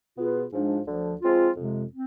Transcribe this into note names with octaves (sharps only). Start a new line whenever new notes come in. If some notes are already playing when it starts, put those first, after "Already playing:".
B2 B3 F4 G#4 B4
G#2 F3 G#3 D4
D2 D3 F3
F3 G#3 C4 F4
F2 C3 G#3
C4